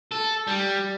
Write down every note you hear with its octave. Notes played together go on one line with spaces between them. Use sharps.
A4
G3